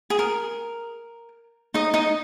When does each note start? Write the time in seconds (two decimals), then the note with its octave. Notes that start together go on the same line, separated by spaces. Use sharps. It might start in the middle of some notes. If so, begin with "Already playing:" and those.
0.10 G#4
0.19 A#4
1.74 D#4 D#5
1.94 D#4 D#5